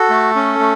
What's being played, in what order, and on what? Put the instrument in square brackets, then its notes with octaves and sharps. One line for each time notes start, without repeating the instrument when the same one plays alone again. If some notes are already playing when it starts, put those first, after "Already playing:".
Already playing: [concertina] F#4 A4
A3
C#4
A3